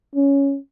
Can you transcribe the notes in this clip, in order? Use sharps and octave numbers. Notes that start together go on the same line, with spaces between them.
C#4